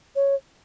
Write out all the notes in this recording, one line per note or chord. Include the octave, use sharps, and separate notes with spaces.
C#5